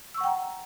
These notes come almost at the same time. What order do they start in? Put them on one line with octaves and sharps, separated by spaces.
E6 C#6 F#5 G5 A#5